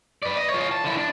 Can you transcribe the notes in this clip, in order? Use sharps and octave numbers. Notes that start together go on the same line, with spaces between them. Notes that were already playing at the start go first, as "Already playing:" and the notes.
B4 D5
D#5
F4 C#5
A5
D3 E4
D4